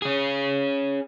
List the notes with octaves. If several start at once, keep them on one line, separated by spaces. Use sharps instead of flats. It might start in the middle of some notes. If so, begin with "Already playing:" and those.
C#4 G#4